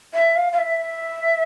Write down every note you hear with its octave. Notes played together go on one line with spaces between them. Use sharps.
E5
F5
F5
E5